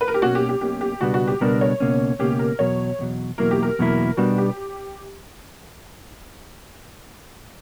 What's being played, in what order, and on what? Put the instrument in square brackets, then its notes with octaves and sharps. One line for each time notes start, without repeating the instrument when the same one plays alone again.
[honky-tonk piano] B4
A#4
G4
[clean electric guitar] B1 B2 A#3 C#4 [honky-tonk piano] F#4
[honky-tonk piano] G4
G4
[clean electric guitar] B1 B2 A#3 C#4 [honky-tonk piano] G4
[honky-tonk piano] G4
[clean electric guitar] C#2 B2 G3 B3 D4 [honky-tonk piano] F#4
[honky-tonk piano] F#4
G4
[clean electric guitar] C#2 B2 G3 B3 D4 [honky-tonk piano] A#4
[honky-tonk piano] C#5
[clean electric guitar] C#2 B2 A#3 C#4
[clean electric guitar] C#2 B2 A#3 C#4 [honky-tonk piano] G4
[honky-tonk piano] A#4
[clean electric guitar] E2 B2 F#3 [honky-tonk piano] C#5
[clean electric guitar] E2 B2 F#3
[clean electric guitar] E2 B2 F#3 A#3 E4 [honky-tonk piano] A#4
[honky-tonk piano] G4
A#4
[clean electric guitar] E2 B2 F#3 A#3 E4
[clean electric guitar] B2 G3 B3 D4 [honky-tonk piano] F#4
[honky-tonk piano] G4